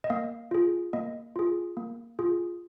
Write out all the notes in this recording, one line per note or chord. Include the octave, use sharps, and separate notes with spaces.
D#5
A#3 F5
F4 G#4
A#3 D#5
F4 G#4
A#3
F4 G#4